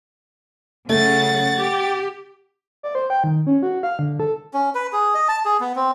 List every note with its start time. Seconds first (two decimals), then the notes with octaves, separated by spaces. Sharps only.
0.89 C#3 F#3 A3 F#5 A6
1.54 G4
2.83 D5
2.95 C5
3.10 G5
3.24 D#3
3.47 C#4
3.63 F#4
3.83 F5
3.99 D3
4.20 A4
4.54 C#4
4.75 B4
4.93 G#4
5.14 D#5
5.28 A5
5.45 G#4
5.60 B3
5.76 C4